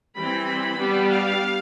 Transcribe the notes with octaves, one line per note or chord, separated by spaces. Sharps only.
E3 G3 C4 B5
G3 B3 D4
F5